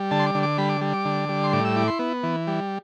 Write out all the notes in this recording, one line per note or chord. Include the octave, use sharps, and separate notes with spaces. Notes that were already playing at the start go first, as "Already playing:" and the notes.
Already playing: G3
D3 A5
C6
D6
D3
D6
G3 B5
D6
G3
D6
D3
G3
C6
A2 D6
E6
E4 D6
C6
B3
E3
G3